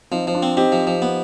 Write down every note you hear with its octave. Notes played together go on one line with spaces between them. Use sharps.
F3 C4 D#4
F3
D4 F4
C4
C4 D#4 G4
F3
F3
B3